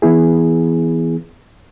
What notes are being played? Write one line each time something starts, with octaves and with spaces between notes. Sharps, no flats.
E3 B3 E4 G#4